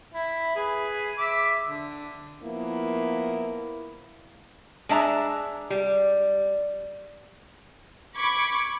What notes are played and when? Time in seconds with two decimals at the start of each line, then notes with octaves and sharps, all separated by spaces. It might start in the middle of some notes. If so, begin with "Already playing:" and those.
0.14 E4
0.56 G#4 B4
1.18 E5 D6
1.67 D3
2.43 F3 A#3 B3 E4
4.89 G#3 D4 E5 A#5
5.70 G3
8.15 B5 C#6 D6 G#6